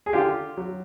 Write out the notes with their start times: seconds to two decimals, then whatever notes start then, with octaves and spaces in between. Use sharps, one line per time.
0.06 G#4
0.13 D3 F4 G4
0.57 F#3